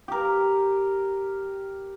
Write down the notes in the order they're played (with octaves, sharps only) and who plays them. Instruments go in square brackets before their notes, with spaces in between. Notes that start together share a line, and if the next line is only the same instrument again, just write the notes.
[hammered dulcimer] G4 A#4